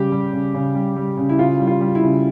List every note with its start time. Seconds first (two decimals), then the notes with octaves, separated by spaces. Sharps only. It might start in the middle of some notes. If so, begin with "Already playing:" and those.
Already playing: C#3 G3 G4
0.12 G3
0.33 C#3
0.54 C#3
0.75 G3
0.96 G3
1.17 C#3
1.29 E4
1.39 C#3 F4
1.60 G3
1.67 F4
1.81 G3
1.95 E4
2.03 C#3